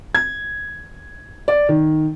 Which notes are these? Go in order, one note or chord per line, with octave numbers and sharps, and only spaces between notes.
G#6
D5
D#3